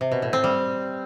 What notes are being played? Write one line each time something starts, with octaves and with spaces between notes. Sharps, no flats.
C3
B2
A2
C4
G3